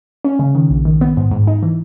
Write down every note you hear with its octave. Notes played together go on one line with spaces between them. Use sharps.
C#4
C#3
D#3
A#1
D#3
B3
G#2
G#2
D#4
E3